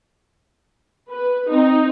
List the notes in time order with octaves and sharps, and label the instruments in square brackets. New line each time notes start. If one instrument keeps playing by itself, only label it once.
[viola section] B4
C4 D#4